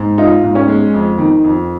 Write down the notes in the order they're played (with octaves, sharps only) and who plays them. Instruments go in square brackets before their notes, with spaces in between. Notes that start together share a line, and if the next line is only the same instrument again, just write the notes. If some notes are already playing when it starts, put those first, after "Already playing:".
Already playing: [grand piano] G#2
[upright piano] D#4 [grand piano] F4
[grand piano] G#2
[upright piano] C#4
[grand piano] G#3
F2
D#3
F2